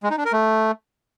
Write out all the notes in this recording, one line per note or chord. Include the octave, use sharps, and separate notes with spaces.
G#3
D#4
D4
A#4
A3